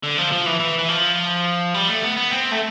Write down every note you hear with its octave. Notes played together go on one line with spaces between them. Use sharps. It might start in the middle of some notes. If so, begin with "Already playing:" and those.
D3
F3
F3
E3
E3
E3
F3
G3
A3
B3
B3
C4
A3